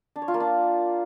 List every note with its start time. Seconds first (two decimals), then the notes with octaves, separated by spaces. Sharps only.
0.16 D4
0.22 C#5
0.28 F4
0.34 A#3
0.40 D4